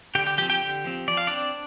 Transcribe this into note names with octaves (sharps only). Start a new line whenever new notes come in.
D3 G4 G5
G4 G5
F3 C4 G4 G5
G4 G5
D3
F3 C4
F3 D5
F5
C4 D4 D5